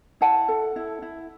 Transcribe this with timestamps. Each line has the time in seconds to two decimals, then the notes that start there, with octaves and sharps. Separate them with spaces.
0.21 E4 F#5 A5
0.48 A4
0.76 E4
1.02 E4